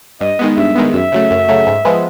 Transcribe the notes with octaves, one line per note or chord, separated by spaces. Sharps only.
G2 D#5
D#3 G#3 B3
G2 E5
D#3 G#3 B3
F#2 E5
C#3 F#3 A3
F#2
C#3 F#3 A3
G#2
F3 G#3 B3